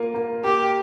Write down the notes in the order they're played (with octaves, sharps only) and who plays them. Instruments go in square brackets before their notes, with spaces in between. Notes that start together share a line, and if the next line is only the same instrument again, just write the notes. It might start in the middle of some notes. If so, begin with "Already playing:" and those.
Already playing: [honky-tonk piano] A#3 F4
A#3
[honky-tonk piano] A#3 [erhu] G4